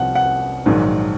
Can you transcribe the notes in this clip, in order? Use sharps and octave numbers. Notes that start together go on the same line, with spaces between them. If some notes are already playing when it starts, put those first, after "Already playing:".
Already playing: C2 C3 F3 F#5
F#5
A#1 G#2 D#3 F#3